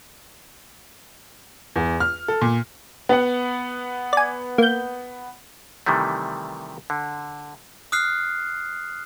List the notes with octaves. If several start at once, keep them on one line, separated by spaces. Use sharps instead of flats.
E2
F6
A4
A#2
B3 F#5
D5 G#5
A#3 G6
C3 D#3 E3 G3 A3
D3
D#6 F6 F#6 C7